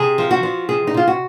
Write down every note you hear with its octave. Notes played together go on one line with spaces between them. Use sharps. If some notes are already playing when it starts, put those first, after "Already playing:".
Already playing: C3 G#4
F3
F#4
F3
C3 G#4
D#4
C3 F4
F#4